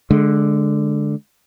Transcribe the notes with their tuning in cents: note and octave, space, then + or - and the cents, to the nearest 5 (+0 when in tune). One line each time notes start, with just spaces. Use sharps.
D3 +0 G#3 +20